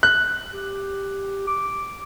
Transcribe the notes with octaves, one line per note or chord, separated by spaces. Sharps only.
F#6
G4
D6